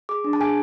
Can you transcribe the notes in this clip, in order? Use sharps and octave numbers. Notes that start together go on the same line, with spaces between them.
G#4 D6
D4
A5
G#4 G#5